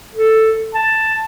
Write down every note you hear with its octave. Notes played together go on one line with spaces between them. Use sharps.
A4
A5